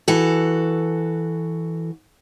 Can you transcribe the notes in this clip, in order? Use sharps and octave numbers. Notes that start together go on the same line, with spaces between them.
E3 F#4 A4